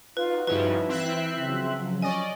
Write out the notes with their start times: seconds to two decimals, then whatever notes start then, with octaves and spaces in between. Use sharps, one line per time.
0.17 D#4 F4 F#4 B4
0.47 G2 C#3 F3 E4 B4
0.89 E3 C4 E5 F#6 C7
1.35 C#3 F3 F#3
2.02 C#4 D5 D#5 G#5